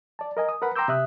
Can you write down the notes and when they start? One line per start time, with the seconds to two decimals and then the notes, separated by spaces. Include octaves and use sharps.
0.19 D5 A5
0.37 A#4 D#5 G#5
0.49 D#6
0.62 A#4 B4 F#5 B5
0.76 G5 A#5 C6 D6 E6 G6
0.88 C3 E5 D#6 F#6